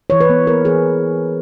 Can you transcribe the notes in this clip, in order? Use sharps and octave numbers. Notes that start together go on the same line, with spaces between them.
E3 C#5
B4
B3
B3 A#4
E3 G#4